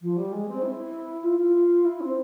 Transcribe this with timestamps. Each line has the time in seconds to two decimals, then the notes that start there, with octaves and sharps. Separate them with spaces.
0.02 F3
0.17 G3
0.32 G#3
0.48 C4
0.62 E4
1.23 F4
1.39 F4
1.85 E4
2.01 C4